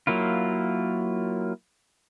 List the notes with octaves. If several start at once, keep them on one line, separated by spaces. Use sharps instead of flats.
F#3 A#3 E4 F4